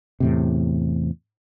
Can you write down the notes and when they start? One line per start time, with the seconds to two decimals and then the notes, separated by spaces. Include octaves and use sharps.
0.20 E2 A2 C3